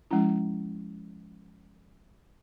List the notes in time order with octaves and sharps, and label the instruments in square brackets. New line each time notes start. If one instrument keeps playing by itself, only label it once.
[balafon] F3 G#3 C#4 E4